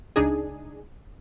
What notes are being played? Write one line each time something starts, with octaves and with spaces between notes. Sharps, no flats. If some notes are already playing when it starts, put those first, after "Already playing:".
C#2 C#3 D4 D#4 G#4